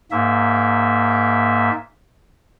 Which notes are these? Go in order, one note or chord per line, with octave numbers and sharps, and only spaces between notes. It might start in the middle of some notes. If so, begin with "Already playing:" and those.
G#2 A#3 E5